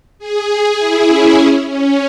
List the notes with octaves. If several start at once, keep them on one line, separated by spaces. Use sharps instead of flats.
G#4
E4
C#4
C#4
C#4